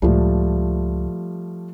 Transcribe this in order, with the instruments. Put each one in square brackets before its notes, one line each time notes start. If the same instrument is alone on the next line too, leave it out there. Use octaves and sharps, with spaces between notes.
[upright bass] C#2 A2 [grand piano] F3 G3 A3